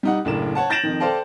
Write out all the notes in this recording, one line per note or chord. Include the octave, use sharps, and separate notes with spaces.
G3 D#4 F#5
F#1 A2 D4 A#4 E7
C#5 F#5 A5
G6 A6 A#6 D7 E7 F#7
F2 D#3
A4 C5 D5 F5 G5 A5